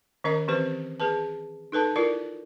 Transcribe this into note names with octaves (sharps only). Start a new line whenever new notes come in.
D#3 C#4 A#4 D#5 A#5
E3 C4 G4 B4 C5
G#4 B4 A5
D#4 A4 B4 A5
E4 F4 A#4 D5